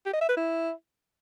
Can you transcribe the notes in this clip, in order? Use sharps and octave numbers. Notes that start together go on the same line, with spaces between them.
G4
D#5
E5
B4
E4